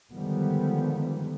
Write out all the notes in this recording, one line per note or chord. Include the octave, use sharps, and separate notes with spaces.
D3 D#3 F3 G3 G#3 B3